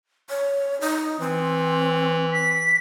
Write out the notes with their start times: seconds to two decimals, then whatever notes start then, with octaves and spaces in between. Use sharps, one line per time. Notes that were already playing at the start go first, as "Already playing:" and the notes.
0.29 C#5
0.81 D#4
1.20 E3 C4
2.32 B6